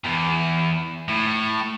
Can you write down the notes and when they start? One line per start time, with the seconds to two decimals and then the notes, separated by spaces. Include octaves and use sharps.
0.04 E2
1.09 A2